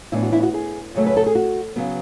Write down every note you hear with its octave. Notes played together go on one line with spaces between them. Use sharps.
A2 E3 B3 D4 E4
F#4
E4
F#4
G#4
F#2 C#3 F#3 A3 C#5
B4
A4
G#4
F#4
C#3 F#3 B3